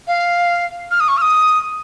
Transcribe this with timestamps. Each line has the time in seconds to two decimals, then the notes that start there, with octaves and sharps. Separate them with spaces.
0.07 F5
0.91 F6
1.00 D#6
1.08 C#6
1.17 F6
1.22 D#6